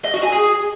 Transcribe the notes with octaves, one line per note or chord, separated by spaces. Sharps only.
D#5
F#4
G#5
G#4